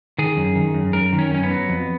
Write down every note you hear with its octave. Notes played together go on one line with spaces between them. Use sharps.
D#3 G#4
F#2
D#3
F#2
F#2 A#4
D#3
C#4
F#2 C#4
B3
F#3
F2